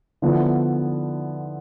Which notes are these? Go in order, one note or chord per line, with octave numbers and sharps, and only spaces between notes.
D3 F3 B3 E4